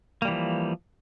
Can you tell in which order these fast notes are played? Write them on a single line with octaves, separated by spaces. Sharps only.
A#3 G3 E3 F3